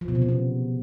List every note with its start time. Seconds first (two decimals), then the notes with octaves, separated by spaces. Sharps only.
0.01 F3
0.08 B2
0.15 C3
0.22 C#3
0.29 B3